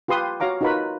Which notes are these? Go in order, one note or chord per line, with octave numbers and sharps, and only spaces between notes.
F4 G4 B4 C6 D#6
F#4 C#5 F5 A#5 D6
D#4 F4 F#4 A#4 B4 B5